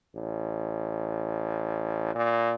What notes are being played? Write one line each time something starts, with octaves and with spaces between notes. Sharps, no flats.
A1
A#2